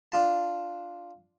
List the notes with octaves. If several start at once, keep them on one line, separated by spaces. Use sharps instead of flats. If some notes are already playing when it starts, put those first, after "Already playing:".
D4 F4 A5